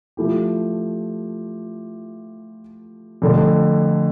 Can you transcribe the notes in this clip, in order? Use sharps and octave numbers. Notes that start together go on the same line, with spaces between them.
F3 A3 E4 G4
F2 D3 A3